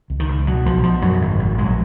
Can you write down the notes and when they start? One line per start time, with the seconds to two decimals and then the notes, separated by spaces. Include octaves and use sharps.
0.10 C#2
0.20 D#3
0.28 C#2
0.47 B2 F#3
0.66 B1 F3
0.83 B2 F3
1.02 F#2 F#3
1.21 G#1
1.39 G#1
1.58 A#1 G#3
1.65 F#3